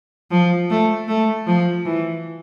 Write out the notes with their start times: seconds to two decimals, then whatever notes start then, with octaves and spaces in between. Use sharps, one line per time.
0.31 F3
0.70 A3
1.08 A3
1.47 F3
1.86 E3